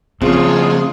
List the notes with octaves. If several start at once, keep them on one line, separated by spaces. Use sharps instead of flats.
F2 C#3 C4 F4 G#4 C#5